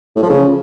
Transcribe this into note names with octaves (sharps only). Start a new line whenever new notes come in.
A2
F3
C#3